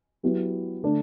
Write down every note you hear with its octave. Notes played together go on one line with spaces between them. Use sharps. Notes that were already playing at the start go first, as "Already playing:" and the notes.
F#3 B3 E4 G4
D3 A3 D4